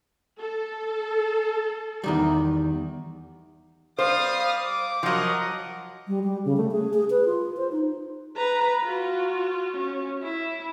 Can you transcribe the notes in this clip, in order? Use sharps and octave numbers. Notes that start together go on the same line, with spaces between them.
A4
E2 D#3 G3
G3 C5 F5 D#6
D6
F3 F#3 A#4 D#5 F#5
G3
G3
C#3
A3
G#4
G#4
B4
F4
C5
D#4
B4 A#5
F4 F#4
C#4
E4